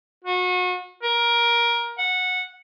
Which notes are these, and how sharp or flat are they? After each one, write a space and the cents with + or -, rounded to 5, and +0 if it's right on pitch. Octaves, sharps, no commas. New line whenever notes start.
F#4 -35
A#4 +20
F#5 -15